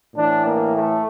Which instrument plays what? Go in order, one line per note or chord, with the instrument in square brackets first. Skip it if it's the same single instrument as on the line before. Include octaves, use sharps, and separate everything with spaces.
[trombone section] A2 E3 D4
A#3
A3